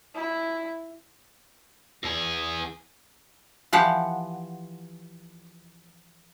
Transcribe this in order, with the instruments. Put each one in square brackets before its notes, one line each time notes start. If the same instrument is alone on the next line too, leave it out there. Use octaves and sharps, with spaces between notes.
[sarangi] E4
[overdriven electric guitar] E2 G#4
[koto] E3 F3 G4 F#5